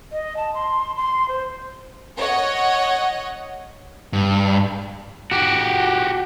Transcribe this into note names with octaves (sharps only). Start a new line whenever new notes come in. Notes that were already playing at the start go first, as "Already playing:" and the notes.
D#5
A5
C6
C6
C5
C#5 D#5 F#5
G2
F#4 G4